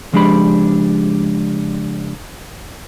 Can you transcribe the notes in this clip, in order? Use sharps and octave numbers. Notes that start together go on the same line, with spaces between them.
C#2 F3 G#3 D4 G4 B5